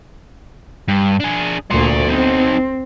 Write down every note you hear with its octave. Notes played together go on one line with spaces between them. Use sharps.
G2
D4 G#4
D2 A#2 D5 C6
B3 C4 D#4